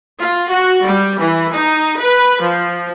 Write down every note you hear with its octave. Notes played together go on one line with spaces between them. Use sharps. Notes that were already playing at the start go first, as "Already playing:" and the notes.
F4
F#4
G3
E3
D#4
B4
F3